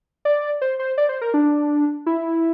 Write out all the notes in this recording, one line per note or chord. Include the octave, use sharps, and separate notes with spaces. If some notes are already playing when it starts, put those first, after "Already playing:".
D5
C5
C5
D5
C5
A#4
D4
E4